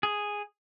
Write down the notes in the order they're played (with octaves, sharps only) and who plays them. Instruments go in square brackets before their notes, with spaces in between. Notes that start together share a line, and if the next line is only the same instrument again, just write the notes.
[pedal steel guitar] G#4